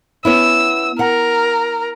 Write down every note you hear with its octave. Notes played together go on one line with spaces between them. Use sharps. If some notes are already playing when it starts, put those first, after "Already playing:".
B3 C#4 E4 E6
A#4 F#5